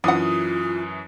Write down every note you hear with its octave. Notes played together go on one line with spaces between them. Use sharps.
F#2 E3 D4 F4 F#5 D#6